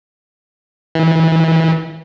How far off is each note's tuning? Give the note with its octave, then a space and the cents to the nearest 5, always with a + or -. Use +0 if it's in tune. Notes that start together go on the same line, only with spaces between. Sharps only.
E3 -25